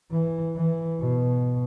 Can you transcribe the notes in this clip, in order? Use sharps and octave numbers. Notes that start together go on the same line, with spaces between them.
E3
E3
B2